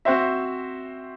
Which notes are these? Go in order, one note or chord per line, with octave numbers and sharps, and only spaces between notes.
C4 F#4 C5 E5